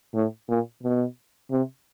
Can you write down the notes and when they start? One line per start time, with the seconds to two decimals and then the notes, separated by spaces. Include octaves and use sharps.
0.14 A2
0.48 A#2
0.83 B2
1.51 C3